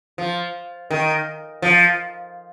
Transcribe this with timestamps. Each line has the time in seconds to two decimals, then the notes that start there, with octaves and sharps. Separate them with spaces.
0.18 F3
0.91 D#3
1.62 F3